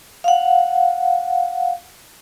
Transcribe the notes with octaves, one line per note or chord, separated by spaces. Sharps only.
F5 F#5